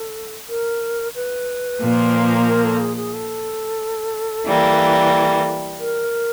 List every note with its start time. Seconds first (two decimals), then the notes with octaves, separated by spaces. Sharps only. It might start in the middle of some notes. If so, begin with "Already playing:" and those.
Already playing: A4
0.49 A#4
1.15 B4
1.81 A#2 F3 A#3
2.48 A#4
2.64 A4
2.80 G#4
2.96 G#4
3.13 A4
4.46 E3 G3 A#3
5.79 A#4